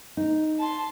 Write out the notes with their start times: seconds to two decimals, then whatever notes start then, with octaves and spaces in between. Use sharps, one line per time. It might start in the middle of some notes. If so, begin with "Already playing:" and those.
0.17 D#4
0.59 A5 C6